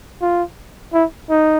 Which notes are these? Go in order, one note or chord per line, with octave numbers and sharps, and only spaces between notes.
F4
E4
D#4